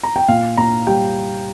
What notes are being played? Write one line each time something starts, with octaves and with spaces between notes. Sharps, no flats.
A#5
G5
A#2 F5
A#2 A#5
G3 G5